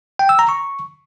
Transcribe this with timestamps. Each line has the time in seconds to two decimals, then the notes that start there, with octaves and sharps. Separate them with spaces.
0.19 G5
0.29 E6
0.39 A#5
0.49 C#6